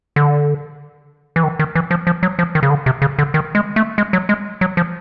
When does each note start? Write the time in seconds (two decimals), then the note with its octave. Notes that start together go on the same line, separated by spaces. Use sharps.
0.16 D3
1.36 E3
1.43 D#3
1.59 D#3
1.75 E3
1.91 F3
2.07 F3
2.23 F#3
2.39 F3
2.55 D#3
2.63 C#3
2.70 D3
2.86 C3
3.02 C#3
3.19 D3
3.34 D#3
3.55 G#3
3.76 A3
3.98 G#3
4.13 F#3
4.29 G#3
4.61 F#3
4.77 F3